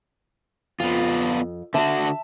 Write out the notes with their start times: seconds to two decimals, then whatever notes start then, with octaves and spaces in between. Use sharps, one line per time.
0.80 F2 B3 F4
1.74 D3 F#4 E5 A5